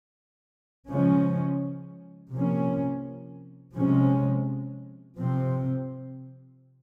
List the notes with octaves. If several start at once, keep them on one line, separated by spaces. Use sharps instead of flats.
C#3 F3 G#3 C#4
C3 F3 A#3 C#4
C3 F3 G#3 C#4
C3 F3 C4